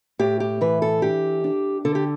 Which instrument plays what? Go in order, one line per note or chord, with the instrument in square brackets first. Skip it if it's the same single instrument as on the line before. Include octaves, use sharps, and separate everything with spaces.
[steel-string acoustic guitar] A2 G4
G4
E3 B4
A4
D4 G4
D4
D3 A4
G4